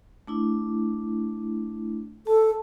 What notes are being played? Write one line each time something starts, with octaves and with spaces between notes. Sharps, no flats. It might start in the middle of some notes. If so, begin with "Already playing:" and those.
A3 D4 E4
A4 A5